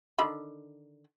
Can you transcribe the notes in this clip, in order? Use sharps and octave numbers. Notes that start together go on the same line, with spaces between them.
D3 D#3 B5